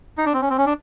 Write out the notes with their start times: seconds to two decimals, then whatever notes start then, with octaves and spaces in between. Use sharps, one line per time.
0.18 D#4
0.26 D4
0.33 C4
0.42 C#4
0.50 C4
0.58 C#4
0.66 D4